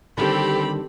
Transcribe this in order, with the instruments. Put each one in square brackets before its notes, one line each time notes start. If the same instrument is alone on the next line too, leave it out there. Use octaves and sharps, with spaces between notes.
[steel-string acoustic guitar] D3 D#3 G3 [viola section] C4 G4 A4 [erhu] B5